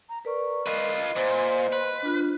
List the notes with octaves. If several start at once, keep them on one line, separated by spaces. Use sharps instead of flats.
A#5
A#4 B4 D5 C#6
F4 B4 D#5
A#2 C5
B4
D4 F4